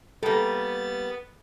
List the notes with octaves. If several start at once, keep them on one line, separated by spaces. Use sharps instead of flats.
G3 A#3 B3 A4 A6